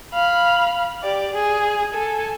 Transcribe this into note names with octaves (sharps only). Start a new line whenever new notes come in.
F5 B5
G4 D5
G#4
A4 G#5